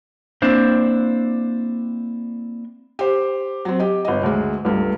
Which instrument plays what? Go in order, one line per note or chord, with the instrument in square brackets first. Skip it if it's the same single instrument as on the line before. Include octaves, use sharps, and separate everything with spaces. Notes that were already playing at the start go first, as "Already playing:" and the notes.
[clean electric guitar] A#3 C4 D4 E4 C5
[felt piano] G4 C5
F#3 C4
G4 D#5
G1 D#5
D2 G#3
C#2 G2 A3